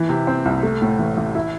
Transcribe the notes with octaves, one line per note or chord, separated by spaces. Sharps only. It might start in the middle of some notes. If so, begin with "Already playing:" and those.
Already playing: E3
C3
C4
C2
A3
A2
A1
A1
E4